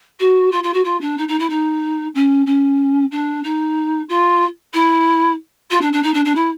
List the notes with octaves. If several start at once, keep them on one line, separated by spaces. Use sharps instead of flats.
F#4
F4
F4
F#4
F4
D4
D#4
D#4
E4
D#4
C#4
C#4
D4
D#4
F4
E4
F4
D4
D4
D#4
D4
D4
E4